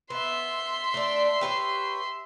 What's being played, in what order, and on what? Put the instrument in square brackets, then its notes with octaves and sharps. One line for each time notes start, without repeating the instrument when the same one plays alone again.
[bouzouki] B3 [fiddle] E5 C6
[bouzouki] A3 D4
G4 B4 C#5